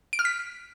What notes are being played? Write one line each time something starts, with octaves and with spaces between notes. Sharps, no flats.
D7
F6
B6